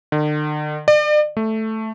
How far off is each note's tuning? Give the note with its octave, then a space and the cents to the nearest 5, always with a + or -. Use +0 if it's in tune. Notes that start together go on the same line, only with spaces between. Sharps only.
D3 +45
D5 +40
A3 +0